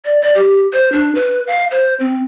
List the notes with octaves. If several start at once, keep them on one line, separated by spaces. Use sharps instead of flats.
D5
D5
G4
C5
D4
B4
F5
C5
C4